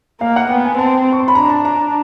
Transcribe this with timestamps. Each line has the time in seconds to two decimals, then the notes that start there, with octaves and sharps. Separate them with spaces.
0.21 A#3 F5
0.36 F#5
0.50 B3 G5
0.65 G#5
0.78 C4 A5
1.12 C#6
1.20 C6
1.28 B5
1.35 D4 A#5
1.50 A5
1.65 A#5